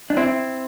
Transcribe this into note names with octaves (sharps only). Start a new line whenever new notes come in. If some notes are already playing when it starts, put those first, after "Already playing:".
D4
C4 E4